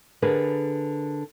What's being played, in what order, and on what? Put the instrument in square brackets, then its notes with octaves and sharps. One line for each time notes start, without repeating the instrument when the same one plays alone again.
[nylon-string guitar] D3 D4 G#4 A#4 B4